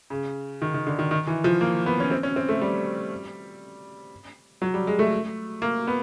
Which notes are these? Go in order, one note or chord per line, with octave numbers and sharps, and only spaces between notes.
C#3
D#3
D#3
D3
D#3
D#3
E3
F3
A#3
B3
C#4
C4
C#4
C4
A3
G3
F#3
G3
G#3
A3
A#3
B3